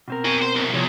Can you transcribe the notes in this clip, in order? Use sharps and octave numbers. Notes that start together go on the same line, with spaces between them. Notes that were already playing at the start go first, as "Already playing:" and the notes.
B2 C4 A#4
F#4 G#5
C5
C2 F#2
E2 C3 F3 C#5